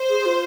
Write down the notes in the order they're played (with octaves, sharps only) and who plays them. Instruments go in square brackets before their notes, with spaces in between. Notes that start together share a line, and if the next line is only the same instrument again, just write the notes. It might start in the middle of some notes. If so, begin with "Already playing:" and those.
Already playing: [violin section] C5
[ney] G#4
G#4
F4